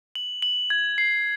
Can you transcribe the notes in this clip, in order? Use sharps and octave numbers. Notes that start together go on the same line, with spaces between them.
F#7
F#7
G#6
C7